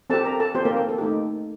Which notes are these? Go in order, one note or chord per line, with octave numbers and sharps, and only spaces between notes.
C4 G4 A4 A5
A#4 A#5
A4 A5
C4 G4 C5
A#3 A#4
A4
A4
A3 D#4 G4